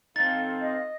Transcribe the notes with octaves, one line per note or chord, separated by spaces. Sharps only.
C4 D#4 F4 A4 F5 A6
D#5